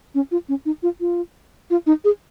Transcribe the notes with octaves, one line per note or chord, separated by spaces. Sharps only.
C#4
F4
C#4
D#4
F4
F4
F4
D#4
G#4